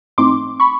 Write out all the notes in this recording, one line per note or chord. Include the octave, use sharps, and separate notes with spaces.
G#2 E3 A3 C4 D#4 C6 D6
B5 C#6